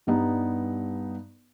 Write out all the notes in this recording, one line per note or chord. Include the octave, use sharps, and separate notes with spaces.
G2 G3 B3 D#4